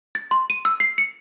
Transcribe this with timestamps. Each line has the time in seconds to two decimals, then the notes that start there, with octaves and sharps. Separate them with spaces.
0.15 A6
0.31 C6
0.50 D#7
0.65 E6
0.80 C7
0.98 C#7